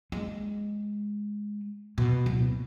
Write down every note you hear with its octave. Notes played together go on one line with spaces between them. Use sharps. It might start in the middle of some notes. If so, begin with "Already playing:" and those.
G#3
B2
D1